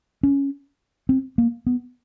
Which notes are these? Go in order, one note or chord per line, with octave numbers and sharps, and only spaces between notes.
C#4
C4
A#3
B3